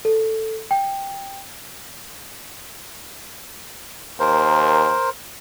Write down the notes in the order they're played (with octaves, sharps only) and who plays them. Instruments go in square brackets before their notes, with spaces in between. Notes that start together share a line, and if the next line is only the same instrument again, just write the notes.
[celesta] A4
G5
[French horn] D#2 [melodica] A#4 C5